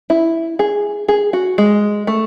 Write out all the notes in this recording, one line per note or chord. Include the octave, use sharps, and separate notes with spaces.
E4
G#4
G#4
F#4
G#3
A3